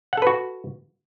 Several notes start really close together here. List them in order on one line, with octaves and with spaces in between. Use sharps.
F#5 A4 B4 F#4